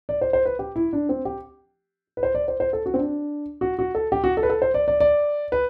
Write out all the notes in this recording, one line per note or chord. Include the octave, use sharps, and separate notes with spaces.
D5
C5
C5
B4
G4
E4
D4
C4
G4
B4
C5
D5
C5
C5
A4
F#4
C4
D4
F#4
F#4
A4
G4
F#4
A4
B4
A4
C5
D5
D5
D5
B4